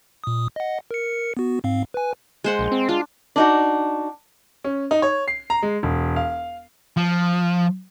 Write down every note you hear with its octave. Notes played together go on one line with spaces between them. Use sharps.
A#2 D#6
D#5 F#5
A#4 C#7
B3 F#4
G#2 C4 F5
B4 G#5
G#3 C5 F#5
A#1
C4
D4 F4
D4 D#4 F#4
C#4
D#4
C#5
C7
A#5
G#3
E1
F5
F3